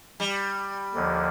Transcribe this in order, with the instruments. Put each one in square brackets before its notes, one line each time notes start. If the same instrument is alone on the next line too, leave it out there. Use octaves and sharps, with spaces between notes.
[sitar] G3
[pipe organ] D#2 D3 F3